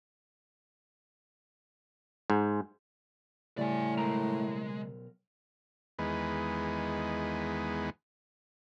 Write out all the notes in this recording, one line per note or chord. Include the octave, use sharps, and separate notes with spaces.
G#2
A2 C#3 G3 A3 D5 G#5
B1 G#3 A#4 A#5
E2 D#3 G#3 B3